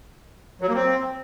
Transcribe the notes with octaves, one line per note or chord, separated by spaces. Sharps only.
F#3
A#3
C4